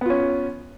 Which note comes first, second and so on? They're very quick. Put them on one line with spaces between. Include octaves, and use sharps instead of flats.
B3 F4 C#4